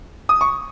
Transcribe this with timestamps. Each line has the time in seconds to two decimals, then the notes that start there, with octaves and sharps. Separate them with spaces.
0.29 D#6
0.41 C#6